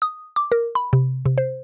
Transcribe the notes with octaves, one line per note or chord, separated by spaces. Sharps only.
D#6
D6
A#4
B5
C3
C3
C5